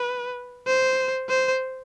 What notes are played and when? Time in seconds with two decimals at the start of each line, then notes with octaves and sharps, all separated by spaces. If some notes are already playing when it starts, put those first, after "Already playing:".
Already playing: B4
0.67 C5
1.29 C5